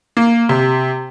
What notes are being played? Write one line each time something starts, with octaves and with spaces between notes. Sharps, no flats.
A#3
C3